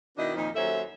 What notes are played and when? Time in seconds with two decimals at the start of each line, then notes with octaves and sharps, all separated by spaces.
0.17 B2 D#3 B3 D4 E4 D#5
0.35 F2 A#2 D#3 F3 D#4
0.55 D#2 F#3 C#4 A4 C5 E5